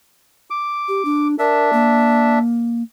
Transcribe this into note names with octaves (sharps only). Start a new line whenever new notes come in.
D6
G4
D4
D4 A#4 E5
A#3